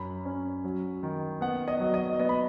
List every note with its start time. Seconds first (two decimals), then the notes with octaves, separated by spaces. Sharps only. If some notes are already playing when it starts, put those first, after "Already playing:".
Already playing: F#2 B5
0.25 C#4
0.64 F#3
1.03 D#3
1.41 B3 F#5
1.68 D#5
1.80 F#3
1.94 D#5
2.19 B3 D#5
2.29 B5